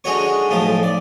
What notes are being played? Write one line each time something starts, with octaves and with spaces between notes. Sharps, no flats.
D3 G#3 D#4 F#4 C#5 C#6
B1 A2 F3 D#4 A5
D5